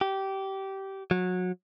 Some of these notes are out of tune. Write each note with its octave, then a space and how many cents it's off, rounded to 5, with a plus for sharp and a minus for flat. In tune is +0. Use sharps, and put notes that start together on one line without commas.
G4 -20
F#3 -25